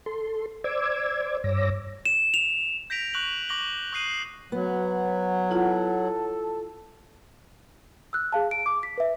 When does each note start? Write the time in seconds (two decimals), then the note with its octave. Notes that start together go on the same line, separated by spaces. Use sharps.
0.06 A4 C6
0.64 C5 D5 D6 E6 G#6
1.44 G2 C#5 D6 E6 A#6
2.05 E7
2.34 F7
2.90 G6 A#6 B6 D7 F7
3.14 C#6 F#6 F7 F#7
3.49 C#6 D6 A#6 F#7 G7
3.92 C#6 D#6 F#6 C7 D#7 F#7
4.52 F#3 B3
5.51 E4 F4 A4 F#5
8.13 E6 F#6
8.32 G#4 F5 A5
8.51 D7
8.66 D6
8.83 B6
8.98 B4 E5